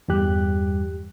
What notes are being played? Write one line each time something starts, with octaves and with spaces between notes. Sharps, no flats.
E2 G2 G3 G4 F#6